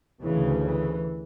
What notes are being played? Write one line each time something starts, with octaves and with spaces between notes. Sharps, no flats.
D2 C#3 E3
E3